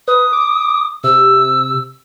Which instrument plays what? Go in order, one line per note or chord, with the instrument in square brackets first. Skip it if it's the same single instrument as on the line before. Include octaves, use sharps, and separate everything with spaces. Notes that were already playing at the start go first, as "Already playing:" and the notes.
[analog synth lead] B4 [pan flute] D#6
[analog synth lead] D6
[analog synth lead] C3 [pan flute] E6